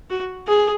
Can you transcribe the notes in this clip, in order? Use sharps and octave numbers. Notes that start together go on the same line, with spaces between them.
F#4
G#4